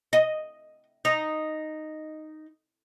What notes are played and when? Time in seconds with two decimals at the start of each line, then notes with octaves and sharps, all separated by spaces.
0.13 D#5
1.05 D#4